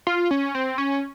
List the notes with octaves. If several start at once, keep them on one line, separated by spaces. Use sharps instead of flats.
F4
C#4
C4
C#4